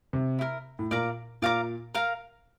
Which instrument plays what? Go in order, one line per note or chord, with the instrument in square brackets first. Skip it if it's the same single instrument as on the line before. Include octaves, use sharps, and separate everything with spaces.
[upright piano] C3
[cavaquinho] E4 G4 A#4
[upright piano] A2
[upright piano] A#2 [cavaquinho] D5 F5 A#5 D6
[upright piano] A#2 [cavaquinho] D5 F5 A#5 D6
[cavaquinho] A#4 F5 A#5